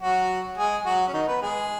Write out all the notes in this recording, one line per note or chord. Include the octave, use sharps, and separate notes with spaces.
F#3 F#4
G#3 G#4
F#3 F#4
C#4
D#3 D#4
B3 B4
G#3 G#4